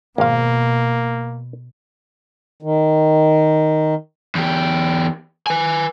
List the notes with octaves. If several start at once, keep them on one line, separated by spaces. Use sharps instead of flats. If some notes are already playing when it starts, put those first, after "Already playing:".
G#1 B2 A#3 F5
D#3
E2 G4
B4 G#5